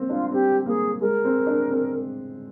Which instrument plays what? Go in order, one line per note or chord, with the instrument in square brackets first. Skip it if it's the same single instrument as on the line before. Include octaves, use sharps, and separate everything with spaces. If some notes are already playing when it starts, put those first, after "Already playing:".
Already playing: [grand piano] A#3 C4
[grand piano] D4 [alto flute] F4
[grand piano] C4 [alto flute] G4
[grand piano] A#3 [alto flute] G#4
[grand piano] G#3 [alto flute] A#4
[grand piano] C4
D4
C4